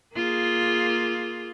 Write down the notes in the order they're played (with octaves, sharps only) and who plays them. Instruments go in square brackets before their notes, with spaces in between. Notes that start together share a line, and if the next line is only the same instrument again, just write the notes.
[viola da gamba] A#3 F4 G#4